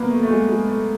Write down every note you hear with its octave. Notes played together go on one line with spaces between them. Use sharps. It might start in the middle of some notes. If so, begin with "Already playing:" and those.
Already playing: A#3 B3
A3
A3
G#3
G#3
A3